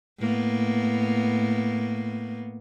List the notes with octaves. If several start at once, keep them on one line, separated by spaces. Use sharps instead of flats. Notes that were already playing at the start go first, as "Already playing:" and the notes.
A2 A#3 B3